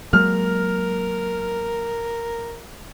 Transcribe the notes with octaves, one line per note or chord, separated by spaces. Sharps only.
F#3 G#3 A#3 A#4 F6